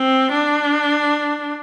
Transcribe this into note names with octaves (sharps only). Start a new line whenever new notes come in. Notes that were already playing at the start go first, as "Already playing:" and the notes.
Already playing: C4
D4